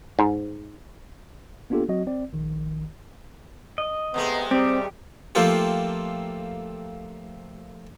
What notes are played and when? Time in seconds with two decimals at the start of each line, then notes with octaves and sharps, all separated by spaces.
0.19 G#2
1.70 A#3 B3 D4 F4 G4 A4
1.89 F#3 C4 F#4 D#5
2.07 C4 D5
2.33 A#1 D#3
3.78 D#5
4.14 C3 G#3 A3 B3
4.51 G3 C4 G4
5.35 F3 A3 A#3 C4 F4 G4